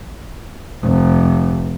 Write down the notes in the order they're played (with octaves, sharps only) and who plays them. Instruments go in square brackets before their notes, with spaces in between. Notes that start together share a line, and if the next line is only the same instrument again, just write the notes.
[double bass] F1